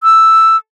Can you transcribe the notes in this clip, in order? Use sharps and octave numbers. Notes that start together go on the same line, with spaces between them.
E6